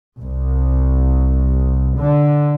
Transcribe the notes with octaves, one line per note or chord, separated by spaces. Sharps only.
C2
D3